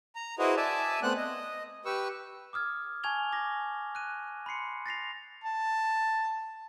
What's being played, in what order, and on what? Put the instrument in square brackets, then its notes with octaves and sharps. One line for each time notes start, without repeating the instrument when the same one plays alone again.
[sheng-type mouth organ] A#5
E4 F#4 G#4 B4 C5 D#5
D5 E5 G#5 A5
A3 B3 C4 F#5 F#6
D#5
G4 B4 C#6 E6
[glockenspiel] D6 D#6 F6 G#6
G#5 A5 C#6 G#6 F7 G7
D6 G#6 A#6
F#6 D#7
B5 C6 C7 C#7
A6 A#6 C7 F7
[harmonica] A5